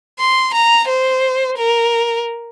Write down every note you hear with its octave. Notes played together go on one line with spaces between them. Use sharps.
C6
A#5
C5
A#4